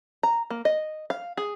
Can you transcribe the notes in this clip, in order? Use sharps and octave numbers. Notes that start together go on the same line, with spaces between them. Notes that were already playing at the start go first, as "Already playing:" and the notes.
A#5
A#3
D#5
F5
G#4